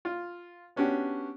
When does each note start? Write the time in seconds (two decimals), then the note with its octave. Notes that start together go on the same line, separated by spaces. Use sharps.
0.05 F4
0.76 B3 C#4 D4 F#4 G4